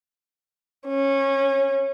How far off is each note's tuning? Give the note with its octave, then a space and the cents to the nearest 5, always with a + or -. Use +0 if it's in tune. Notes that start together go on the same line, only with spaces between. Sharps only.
C#4 -20